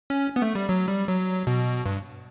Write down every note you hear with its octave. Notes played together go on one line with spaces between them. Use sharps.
C#4
B3
A3
G3
F#3
G3
F#3
B2
G2